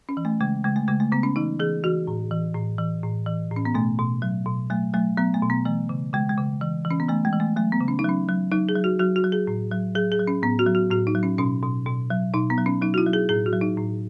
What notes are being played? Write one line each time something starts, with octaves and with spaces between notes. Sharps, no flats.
C#4
E3
A3
C#3 G#3
C#3 G#3
A3
C#3 G#3
A3
C#3 B3
C#4
E3 D#4
E3 G#4
E3 F#4
A2
E3
A2
E3
A2
E3
A2
C#4
B3
B2 A3
B2
F#3
B2
F#3 A3
F#3 A3
F#3 B3
A3
B2
B3
E3 A3
C#3
C#3 G#3
G#3
C#3
E3
E3
C#4
B3
E3 A3
G#3
E3
A3
F#3 A3
B3
C#3
C#4
D#4
F#3 C#4
F#3
F#3 D#4
G#4
F#3
F#4
F#3 F#4
F#4
F#3
G#4
A2
F#3
F#3 G#4
G#4
F#3
C#4
A2 B3
F#4
F#3
F#4
A2 F#4
D#4
F#3
C#4
B2 C#4
B2
B2
F#3
B2 D#4
B3
F#3
C#4
F#3 D#4
F#4
E4
F#3
G#4
A2 G#4
F#4
F#3
D#4
A2